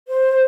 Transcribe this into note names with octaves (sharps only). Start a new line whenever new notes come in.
C5